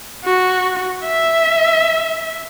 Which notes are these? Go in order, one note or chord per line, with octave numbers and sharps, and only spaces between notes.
F#4
E5